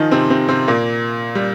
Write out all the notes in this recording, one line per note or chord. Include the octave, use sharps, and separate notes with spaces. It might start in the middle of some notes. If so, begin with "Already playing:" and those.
Already playing: D#3 F3 D#4 F4 G#4
C3 C4
C3 C4
C3 C4
A#2 A#3
G3